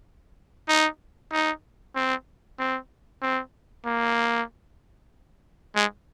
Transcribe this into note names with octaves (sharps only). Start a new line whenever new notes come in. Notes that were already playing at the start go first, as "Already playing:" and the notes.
D#4
D#4
C4
C4
C4
A#3
G#3